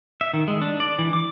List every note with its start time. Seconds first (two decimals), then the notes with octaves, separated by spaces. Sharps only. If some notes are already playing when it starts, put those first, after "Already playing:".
0.21 E5
0.33 D#3
0.48 G#3
0.62 D4
0.80 D5
0.99 E3
1.13 D6